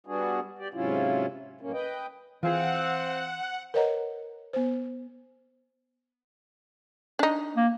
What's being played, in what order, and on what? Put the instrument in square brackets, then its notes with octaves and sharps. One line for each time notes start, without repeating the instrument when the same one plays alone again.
[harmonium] G3 B3 D4 F#4 G#4
G4 D5
G#2 C3 F#3 C#4 E4 F4
F#2 A2 A#3 C#4
B4 D#5 G5
[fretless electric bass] E3 [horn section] C4 [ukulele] F4 G#4 [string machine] F#5
[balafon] A#4 B4 C#5 D#5 F#5 A#5
B3 C5
[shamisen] D4 D#4
[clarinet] A#3